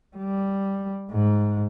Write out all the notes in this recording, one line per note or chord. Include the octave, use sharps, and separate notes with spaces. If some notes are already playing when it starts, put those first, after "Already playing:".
G3
G#2